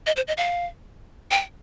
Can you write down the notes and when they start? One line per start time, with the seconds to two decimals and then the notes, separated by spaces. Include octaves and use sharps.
0.07 D#5
0.16 C5
0.28 D#5
0.37 F5
1.31 G5